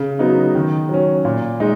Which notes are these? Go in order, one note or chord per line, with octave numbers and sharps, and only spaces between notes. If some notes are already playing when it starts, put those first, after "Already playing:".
Already playing: C#3
F#3 B3 D#4 F#4
D#3
F#3 C#4
A#2
G#3 D#4